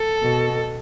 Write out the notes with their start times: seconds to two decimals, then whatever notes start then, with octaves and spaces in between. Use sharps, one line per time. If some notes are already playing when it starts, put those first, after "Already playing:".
Already playing: A4
0.22 B2